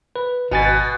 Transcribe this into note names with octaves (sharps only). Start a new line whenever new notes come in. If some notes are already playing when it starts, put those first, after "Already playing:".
B4
G#1 B2 G#5 A6